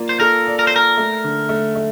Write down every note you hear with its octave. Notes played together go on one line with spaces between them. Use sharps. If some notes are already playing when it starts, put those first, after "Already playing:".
Already playing: A#3 F4 D5
C5
A4 A#4
D5
A#4
C5
A#4 D5
A3
D3
A3
A3